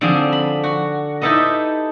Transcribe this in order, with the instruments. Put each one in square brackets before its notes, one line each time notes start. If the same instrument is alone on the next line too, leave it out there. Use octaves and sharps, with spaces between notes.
[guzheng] D3 F3 C4 D4 G#4
B5
F#4
D#4 E4 G4 A4 B4 D#5